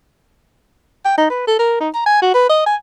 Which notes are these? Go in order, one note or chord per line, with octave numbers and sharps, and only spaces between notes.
G5
D#4
B4
A4
A#4
D#4
A#5
G#5
F#4
B4
D#5
G#5